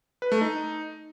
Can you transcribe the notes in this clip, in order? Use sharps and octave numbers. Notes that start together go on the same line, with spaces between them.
B4
A3
D#4